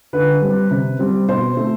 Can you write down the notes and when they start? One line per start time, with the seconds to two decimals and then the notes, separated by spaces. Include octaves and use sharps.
0.13 D3 B4
0.42 G3 C4
0.71 C3
0.99 G3 C4
1.28 B2 C5
1.57 A3 C4